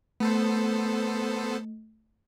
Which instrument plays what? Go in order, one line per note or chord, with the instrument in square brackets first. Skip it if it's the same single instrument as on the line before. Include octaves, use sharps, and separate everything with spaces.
[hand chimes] A3 [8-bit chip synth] B3 A4 C5